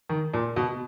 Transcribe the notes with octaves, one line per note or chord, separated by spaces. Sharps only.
D#3
A#2
B2